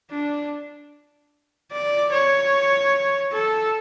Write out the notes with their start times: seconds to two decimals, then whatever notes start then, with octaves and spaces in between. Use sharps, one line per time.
0.11 D4
1.72 D5
2.12 C#5
3.33 A4